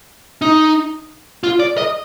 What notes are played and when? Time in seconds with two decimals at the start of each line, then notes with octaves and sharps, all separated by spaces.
0.42 D#4
1.44 F4
1.60 D5
1.78 D#5